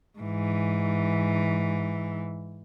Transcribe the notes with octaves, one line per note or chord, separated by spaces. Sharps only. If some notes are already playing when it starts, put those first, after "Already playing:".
G#2 E3